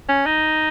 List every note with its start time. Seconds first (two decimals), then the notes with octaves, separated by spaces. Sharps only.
0.09 C#4
0.26 D#4